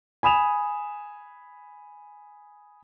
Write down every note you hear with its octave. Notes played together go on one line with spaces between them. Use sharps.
G#5 B5 D#6 E7 F7